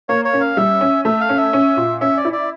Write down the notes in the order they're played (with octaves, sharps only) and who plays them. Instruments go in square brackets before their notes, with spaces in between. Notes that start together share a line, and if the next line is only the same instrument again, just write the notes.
[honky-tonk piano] A#3 [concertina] C#5
[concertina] C#5
[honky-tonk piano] C#4
[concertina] F5
[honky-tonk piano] G3 [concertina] E5
[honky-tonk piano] C#4
[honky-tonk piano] A3 [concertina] E5
[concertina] F5
[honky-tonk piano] C#4
[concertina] E5
[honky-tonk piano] C#4
A#2
[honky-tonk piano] C#4 [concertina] E5
[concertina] D5
[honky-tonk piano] E4
[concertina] D5